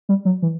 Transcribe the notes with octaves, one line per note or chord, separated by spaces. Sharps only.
G3
F#3
E3